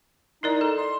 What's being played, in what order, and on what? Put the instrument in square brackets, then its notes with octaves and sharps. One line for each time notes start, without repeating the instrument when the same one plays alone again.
[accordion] D#4 [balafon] E4 A#4 D5
[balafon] A4
[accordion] C6